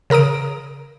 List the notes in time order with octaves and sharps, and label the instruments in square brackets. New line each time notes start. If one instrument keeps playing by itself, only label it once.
[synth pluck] C#3 A#4 A#5 D#6 D7